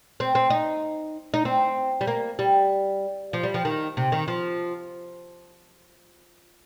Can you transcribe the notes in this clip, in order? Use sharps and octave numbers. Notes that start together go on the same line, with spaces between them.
C4
C4
D#4
D#4
C4
G3
A#3
G3
F3
G3
F3
D#3
C3
D#3
F3